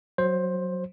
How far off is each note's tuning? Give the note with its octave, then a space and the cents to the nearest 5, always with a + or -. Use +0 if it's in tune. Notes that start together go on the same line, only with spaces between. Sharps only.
F#3 +0 C5 +15